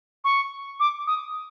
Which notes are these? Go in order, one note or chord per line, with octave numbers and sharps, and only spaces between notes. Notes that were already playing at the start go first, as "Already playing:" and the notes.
C#6
D6
D#6